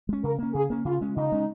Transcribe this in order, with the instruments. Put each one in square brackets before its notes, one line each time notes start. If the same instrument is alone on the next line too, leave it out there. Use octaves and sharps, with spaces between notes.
[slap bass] G#3 C#4
[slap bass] C#3 [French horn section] A#4
[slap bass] A#3 C#4
[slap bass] C#3 [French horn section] G#4
[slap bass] A#3 C#4
[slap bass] C#3 [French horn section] F4
[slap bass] G#3 C#4
[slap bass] C#3 [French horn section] D#4
[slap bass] G#3 C#4